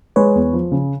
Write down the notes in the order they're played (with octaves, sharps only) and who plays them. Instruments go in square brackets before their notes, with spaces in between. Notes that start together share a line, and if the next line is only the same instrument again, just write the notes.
[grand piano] G#3 [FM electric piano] B4 C#5
[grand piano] E2
F3
C#3